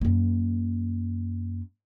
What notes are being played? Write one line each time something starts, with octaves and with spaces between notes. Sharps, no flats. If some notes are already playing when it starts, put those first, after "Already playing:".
F#2 A#3